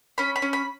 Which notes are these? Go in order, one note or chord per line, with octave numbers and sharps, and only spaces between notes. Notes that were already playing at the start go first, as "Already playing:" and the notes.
C#4 B5
B5
C#4
B5